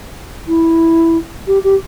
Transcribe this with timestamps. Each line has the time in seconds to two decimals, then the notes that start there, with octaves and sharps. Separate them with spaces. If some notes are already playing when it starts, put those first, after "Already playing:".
0.48 E4
1.47 G4
1.64 G4